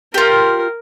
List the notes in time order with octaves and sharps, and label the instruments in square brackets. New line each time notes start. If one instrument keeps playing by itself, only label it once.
[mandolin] F4 G4 [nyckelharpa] A#4